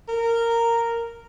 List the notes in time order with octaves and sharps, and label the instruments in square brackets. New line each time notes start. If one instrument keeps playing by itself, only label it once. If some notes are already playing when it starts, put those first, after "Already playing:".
[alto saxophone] A#4